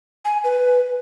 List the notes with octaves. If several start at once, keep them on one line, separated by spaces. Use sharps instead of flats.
G#5
B4